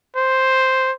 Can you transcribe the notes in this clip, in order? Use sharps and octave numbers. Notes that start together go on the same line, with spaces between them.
C5